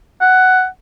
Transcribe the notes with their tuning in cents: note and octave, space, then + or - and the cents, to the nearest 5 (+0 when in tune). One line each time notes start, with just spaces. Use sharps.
F#5 +10